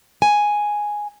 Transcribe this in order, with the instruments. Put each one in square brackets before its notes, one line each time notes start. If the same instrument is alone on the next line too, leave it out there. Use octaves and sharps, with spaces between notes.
[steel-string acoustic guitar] G#5